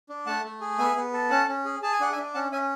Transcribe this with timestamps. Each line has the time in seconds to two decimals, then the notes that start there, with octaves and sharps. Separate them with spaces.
0.09 D4
0.26 A3 F#5 A5
0.44 A3
0.61 G#4
0.78 B3 E5 G#5
0.97 B3
1.13 A4
1.30 C#4 F#5 A5
1.48 C#4
1.65 G#4
1.82 G#4 A5
1.92 G#5
2.01 D4 F#5
2.12 E5 G#5
2.18 D4
2.34 C#4 F#5 A5
2.52 C#4 E5 G#5